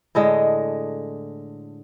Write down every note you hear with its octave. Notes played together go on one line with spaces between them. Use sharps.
A2 D3 G#3 D#5